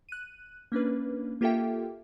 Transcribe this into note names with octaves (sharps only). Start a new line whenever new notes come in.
F#6 D#7
A#3 C#4 D4 B4
A#3 F4 G4 A4 E5 G5